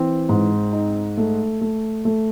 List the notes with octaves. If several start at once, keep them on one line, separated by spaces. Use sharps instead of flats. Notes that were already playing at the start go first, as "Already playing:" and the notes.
Already playing: E3 C4
G#2
D#4
A3
A3
A3